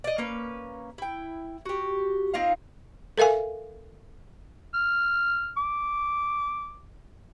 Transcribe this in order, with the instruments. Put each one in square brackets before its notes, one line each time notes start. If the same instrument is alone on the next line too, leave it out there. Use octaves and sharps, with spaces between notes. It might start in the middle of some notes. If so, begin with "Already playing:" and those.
[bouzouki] D5 D#5
A#3 C#4 B4
E4 G5
F#4 G4
C4 D#4 F4 F5
[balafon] A4 A#4 E5 F5 G#5
[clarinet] F6
D6